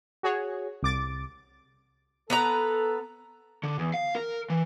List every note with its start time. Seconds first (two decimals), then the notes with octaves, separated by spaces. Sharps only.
0.23 F#4 G#4 C#5
0.83 C2 D6 A6
2.30 B3 A4 B4 A#5
3.63 D3
3.79 E2
3.94 F5
4.15 A#4
4.50 E3